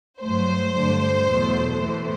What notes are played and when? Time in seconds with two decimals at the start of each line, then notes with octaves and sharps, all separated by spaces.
0.21 G2 F#3 A3 C5
0.75 G2 D3 A3
1.29 E2 B2 F#3 A3
1.82 A2 E3 A3